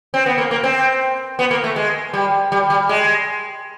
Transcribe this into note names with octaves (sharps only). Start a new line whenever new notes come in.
C4
B3
A#3
A#3
C4
B3
A#3
A3
G#3
G3
G3
G3
G#3